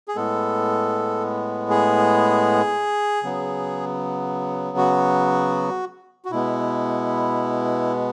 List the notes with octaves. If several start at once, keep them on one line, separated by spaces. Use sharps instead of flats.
G#4
A2 G#3 B3 A4
G#4
C#3 F#3 B3
F#4
F#4
B2 G#3 B3 E4